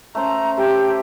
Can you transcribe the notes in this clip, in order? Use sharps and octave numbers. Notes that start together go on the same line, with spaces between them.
A3 C#4 C5 A#5
A3 G4 C5 G5